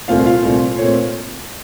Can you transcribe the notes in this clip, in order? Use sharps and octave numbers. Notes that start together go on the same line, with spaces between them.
C2 A#2 A3 C4 F4 F5
F4 F5
C2 A#2 A3 C4
A#2 A3 C4 C#5